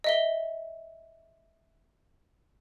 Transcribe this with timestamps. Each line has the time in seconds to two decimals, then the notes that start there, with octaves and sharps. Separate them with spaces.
0.04 D#5 E5 G7